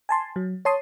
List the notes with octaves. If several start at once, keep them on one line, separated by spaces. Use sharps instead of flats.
G#5 A5 C6
F#3
C#5 A5 C6 D#6